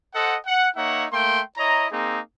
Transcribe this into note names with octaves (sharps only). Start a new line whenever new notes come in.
A4 C5 D#5 F#5
F#5
A#3 D#4 C#5 E5 F#5
A3 A#3 G5 C6
E4 C#5 D#5 A#5
A#3 C4 D#4 G#4